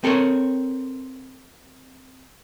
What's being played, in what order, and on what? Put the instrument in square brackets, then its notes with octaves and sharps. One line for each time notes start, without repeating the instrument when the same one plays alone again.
[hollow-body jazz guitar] C4 A4 A#4 C#5